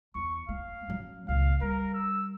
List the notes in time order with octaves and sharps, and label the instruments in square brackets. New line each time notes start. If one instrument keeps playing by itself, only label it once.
[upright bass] E2 [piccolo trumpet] C#6
[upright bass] A3 [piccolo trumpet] F5
[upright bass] F#3 C#4
[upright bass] C#2 A#2 [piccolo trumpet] F5
[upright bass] G3 [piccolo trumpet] A#4
[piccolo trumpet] E6